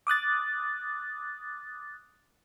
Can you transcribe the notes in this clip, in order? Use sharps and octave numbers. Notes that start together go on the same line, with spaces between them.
D6 D#6 F#6 A6